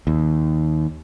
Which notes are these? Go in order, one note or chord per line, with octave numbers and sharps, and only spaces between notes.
D#2